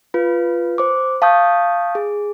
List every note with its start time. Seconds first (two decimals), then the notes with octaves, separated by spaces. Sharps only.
0.14 F4 B4
0.78 C5 D6
1.22 F5 A5 C#6 D#6 G6
1.95 G#4